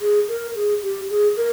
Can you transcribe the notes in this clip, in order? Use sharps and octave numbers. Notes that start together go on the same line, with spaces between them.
G#4
A#4
G#4
G4
G#4
A#4